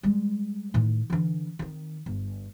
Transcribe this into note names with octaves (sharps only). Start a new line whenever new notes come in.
G3 G#3
A2 D#3
D3 E3
D#3 C4
G1